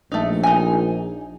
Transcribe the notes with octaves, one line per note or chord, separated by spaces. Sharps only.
A#1 A3 D#4
D#4 G#5